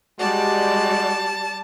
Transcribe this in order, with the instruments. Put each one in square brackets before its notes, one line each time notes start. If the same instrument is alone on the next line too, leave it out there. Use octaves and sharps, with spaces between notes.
[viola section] G3 G4 D5 [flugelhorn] G#3 [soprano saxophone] F#4 [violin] A5